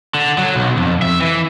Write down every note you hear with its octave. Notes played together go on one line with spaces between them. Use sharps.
D3
F#3
B1
F2
E5
E3